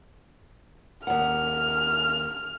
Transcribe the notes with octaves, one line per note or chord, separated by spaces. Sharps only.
D#2 F#5 F6